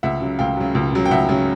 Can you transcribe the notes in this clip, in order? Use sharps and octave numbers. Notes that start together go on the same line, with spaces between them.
C#2 E5 F#5
C#3 F#3
C#2 F5 G5
C#3 F#3
C#2
C#3 F#3
G5
C#2 E5 F#5
C#3 F#3